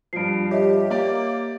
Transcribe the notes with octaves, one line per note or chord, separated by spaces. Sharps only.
G2 F3 C7 D7
G4 C#5 D#5 E5
A#3 G4 D5